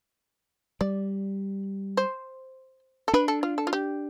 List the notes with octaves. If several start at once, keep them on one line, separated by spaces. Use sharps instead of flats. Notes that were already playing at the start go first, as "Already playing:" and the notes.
G3 D5
C5
A4
D4 B4
A4
F4
A4
F4
G4